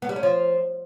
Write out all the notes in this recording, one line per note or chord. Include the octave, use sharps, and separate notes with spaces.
B3
G3
C#4
F3